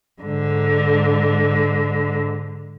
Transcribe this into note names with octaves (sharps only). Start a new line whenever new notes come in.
G#2 D3